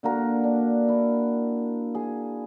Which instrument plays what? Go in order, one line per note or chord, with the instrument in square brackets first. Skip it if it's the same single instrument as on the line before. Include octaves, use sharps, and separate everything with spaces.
[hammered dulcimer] D3 A#3 F#4 A#4
D4
E4
G#4